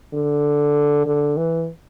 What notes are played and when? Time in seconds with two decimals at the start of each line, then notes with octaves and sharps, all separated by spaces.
0.14 D3
1.06 D3
1.37 E3